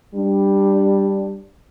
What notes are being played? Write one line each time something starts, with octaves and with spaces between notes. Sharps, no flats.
G3 D4